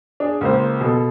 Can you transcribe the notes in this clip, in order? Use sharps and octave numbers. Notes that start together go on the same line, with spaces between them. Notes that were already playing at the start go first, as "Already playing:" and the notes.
D4 G#4
C#2 A#3 C5
B2 A4